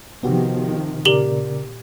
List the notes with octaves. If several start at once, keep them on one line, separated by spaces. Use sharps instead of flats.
C3 D#3 F3 B3 F#4 G4
A#2 C#3 G4 A#4 D5 F#7 G7